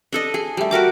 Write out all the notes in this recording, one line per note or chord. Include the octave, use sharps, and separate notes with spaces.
D4 A4 D#5
G#4
G3 A3
F#4 G4 A#4 D6